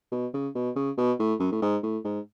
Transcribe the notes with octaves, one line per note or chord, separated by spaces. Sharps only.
B2
C#3
B2
C#3
B2
A2
F#2
A2
G#2
A2
G#2